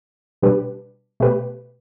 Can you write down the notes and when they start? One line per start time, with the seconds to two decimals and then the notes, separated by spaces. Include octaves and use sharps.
0.42 B2 G3 D4 G4 B4
1.20 B2 A3 G4 B4